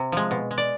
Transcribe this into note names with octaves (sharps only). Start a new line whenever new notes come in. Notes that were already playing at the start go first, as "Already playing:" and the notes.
Already playing: C3
F3 G#3
B2
G#3
D5